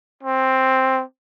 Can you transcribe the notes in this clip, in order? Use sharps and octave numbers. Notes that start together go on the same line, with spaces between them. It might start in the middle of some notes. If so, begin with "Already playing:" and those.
C4